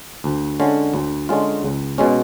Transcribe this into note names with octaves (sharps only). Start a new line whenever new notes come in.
D2
D3 G#3 C#4 F4
D2
D3 G#3 C#4 F4
C#2
B2 G#3 C#4